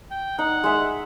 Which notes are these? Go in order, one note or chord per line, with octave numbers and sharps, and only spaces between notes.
G5
D#4 F#5
G#3 E5